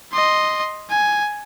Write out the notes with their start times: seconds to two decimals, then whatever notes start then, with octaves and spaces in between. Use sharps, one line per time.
0.13 D#5 C6
0.90 G#5